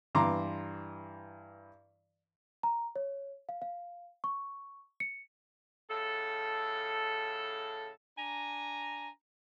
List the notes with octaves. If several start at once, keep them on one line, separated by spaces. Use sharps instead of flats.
G2 E3 A#5 C6 D6
A#5
C#5
F5
F5
C#6
C#7
A2 C#3 A4
D4 G#5 A#5